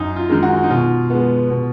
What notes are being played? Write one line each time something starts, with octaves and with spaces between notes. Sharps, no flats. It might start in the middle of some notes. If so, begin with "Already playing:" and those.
Already playing: F#2 D#4
F4
D#3 G#3
F#4
D#4
B2 F4
G#3 B3
B2